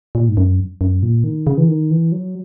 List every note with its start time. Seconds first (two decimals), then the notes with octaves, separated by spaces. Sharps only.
0.15 A#2
0.29 G#2
0.37 F#2
0.81 F#2
1.03 A#2
1.24 D#3
1.47 C#3
1.58 E3
1.68 D#3
1.91 E3
2.12 F#3